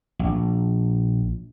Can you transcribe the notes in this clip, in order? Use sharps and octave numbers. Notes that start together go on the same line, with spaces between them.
A#1